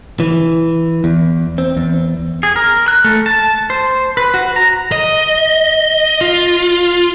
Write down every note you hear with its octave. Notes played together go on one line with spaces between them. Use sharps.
E3
E2
C4
E2
G#4
A#4
F#6
A3
A5
C5
B4
F#4
A#5
D#5
F4